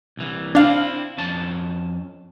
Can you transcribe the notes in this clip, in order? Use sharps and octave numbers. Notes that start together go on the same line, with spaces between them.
C2 E3
C4 D4 E4 F5
F2 C#4 A5